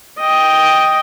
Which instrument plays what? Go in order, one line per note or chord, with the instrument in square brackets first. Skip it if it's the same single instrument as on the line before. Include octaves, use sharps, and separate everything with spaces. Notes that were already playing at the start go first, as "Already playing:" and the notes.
[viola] D#5 G5